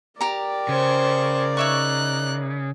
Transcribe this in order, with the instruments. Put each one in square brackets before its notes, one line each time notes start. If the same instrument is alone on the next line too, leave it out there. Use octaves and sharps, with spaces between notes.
[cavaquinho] G4 A#5 [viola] A#4 D5
[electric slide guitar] C#3 [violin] C5 C#6
[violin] D#4 F#6 [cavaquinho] C#5 E5 C#6